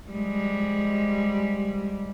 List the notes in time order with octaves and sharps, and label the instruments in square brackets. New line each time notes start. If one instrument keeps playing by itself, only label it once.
[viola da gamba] F3 G3 G#3